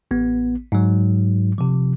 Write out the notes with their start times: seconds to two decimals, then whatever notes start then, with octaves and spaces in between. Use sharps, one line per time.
0.11 A1 B3
0.72 G#2 F#3
1.58 C3 F3